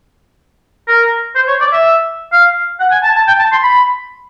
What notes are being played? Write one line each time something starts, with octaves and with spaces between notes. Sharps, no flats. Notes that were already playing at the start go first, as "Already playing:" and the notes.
A#4
C5
C#5
D5
E5
F5
F#5
G#5
A5
A5
G5
A5
C6
B5